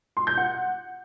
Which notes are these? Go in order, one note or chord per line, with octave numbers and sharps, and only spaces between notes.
C6
G6
F#5